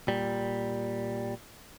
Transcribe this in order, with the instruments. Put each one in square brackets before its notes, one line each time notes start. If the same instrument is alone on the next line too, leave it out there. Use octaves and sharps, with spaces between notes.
[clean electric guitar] A#2 G3